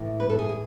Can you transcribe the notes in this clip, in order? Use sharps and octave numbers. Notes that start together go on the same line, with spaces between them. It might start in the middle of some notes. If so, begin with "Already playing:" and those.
Already playing: A2 E3 A3
B4
A4
G#4
G#4